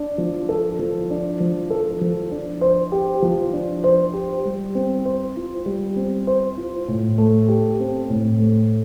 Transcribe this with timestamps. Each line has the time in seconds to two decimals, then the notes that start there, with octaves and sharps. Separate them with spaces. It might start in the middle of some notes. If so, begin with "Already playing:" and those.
Already playing: D4
0.18 F3
0.49 A4
0.79 F3
1.10 D4
1.40 F3
1.70 A4
2.01 F3
2.31 D4
2.61 C5
2.92 G4
3.22 F3
3.53 D4
3.84 C5
4.13 G4
4.45 G3
4.75 C4
5.05 C5
5.36 F4
5.66 G3
5.96 C4
6.27 C5
6.57 F4
6.88 A2
7.18 A3
7.48 G4
7.80 C4
8.10 A2
8.40 A3